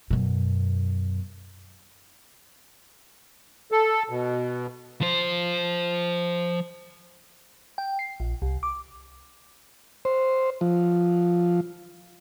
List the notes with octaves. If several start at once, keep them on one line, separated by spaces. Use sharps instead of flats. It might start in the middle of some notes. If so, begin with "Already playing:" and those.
F#2 B2
A4
B2
F3 C5
G5
C7
A#1
C2
D6
C5
F3